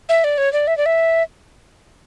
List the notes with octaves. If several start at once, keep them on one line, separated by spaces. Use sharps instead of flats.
E5
D5
C#5
D5
E5
D5
E5